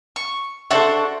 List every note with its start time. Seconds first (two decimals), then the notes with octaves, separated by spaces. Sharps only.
0.16 C#6
0.71 D4 F#4 A4 C5 E5 F#5